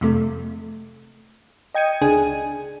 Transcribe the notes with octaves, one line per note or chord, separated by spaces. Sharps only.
F2 C3 A3
D#5 G5 G#6 C#7 D#7
C#2 D4 G#4 G#5 D#7